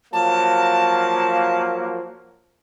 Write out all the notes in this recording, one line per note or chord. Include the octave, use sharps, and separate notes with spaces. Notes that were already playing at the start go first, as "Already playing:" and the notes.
F3 F#3 A#3 A5